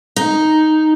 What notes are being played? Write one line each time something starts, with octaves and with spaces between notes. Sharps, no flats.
D#4